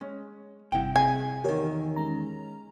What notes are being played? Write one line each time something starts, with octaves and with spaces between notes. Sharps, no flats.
G#3 C#4
G1 C3 G3 E4 F#5 G5
C3 G#4 D#5 G#5
E2 D#3 G4 A#4 C#5
G#3 C#4 A#5